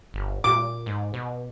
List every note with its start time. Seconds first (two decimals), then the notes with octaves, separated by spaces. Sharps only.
0.14 G1
0.44 A#2 D6
0.86 G#2
1.14 B2